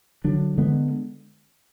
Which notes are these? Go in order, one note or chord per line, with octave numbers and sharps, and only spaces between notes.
D3 F#3 D4
D3 G#3 B3